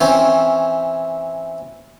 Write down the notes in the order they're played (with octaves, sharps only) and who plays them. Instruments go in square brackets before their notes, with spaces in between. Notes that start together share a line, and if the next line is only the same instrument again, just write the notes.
[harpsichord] E3 C4 C#4